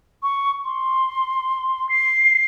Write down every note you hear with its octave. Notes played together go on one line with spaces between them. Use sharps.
C#6
C6
C7